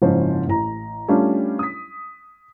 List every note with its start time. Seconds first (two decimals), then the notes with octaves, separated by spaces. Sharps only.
0.02 F#1 G#2 F3 C4 C#4 C5
0.48 A1 A#5
1.08 G3 A3 C#4 D4 F4 G4
1.59 D#6 B6